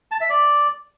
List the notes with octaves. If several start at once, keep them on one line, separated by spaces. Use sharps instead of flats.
A5
E5
D5